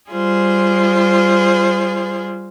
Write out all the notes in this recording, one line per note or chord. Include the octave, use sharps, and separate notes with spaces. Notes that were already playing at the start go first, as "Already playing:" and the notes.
G3 F4 G#4 C5